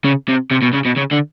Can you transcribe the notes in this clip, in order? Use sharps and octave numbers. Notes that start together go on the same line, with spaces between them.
C#3
C3
C3
B2
C#3
B2
C#3
D3